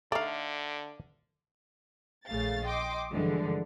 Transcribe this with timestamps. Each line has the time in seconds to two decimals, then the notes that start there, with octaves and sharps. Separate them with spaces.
0.12 D3 A3 D#4 D5 F5
2.27 A#1 C#3 A3 F5 A6
2.65 D#5 G5 C6 D6
3.11 G2 D3 E3 F3 G#3